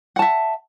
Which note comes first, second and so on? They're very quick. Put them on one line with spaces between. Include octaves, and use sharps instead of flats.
F#5 A5 E5